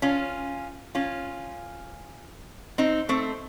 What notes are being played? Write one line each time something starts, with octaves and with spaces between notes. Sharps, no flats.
C#4 F4
C#4 F4
C4 D#4
A3 C4